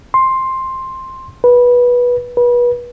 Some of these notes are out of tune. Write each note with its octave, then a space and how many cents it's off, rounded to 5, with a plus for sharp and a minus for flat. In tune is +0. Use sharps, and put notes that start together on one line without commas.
C6 +10
B4 -15
B4 -30